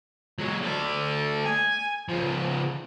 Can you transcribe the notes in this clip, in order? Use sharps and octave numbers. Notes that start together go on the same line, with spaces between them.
F#3 G#3
A3 D5
G#5
C#3 F3